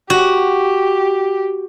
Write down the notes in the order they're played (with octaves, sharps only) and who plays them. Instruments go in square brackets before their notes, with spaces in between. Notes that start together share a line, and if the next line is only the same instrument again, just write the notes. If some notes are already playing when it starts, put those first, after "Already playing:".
[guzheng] F#4 [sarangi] G4